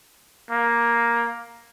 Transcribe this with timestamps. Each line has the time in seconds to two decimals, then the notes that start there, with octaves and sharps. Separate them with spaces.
0.51 A#3